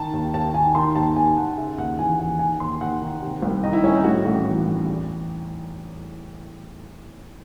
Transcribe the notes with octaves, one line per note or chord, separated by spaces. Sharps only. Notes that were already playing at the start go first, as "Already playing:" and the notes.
Already playing: D#3 A5
D#2
D#2 A5
D#3 G#5
D#3 C6
D#2 A5
D#2 G#5
D#3 F#5
C#3 E5
D#2 F#5
E3 G#5
D#2 G#5
D#3 G#5
D#2 C6
D#2 F#5
D#3
C3
C2
D#3 D#5
E4
C2 C#4
D#4
A2 F#4
A1 F#4
E3
A1
E2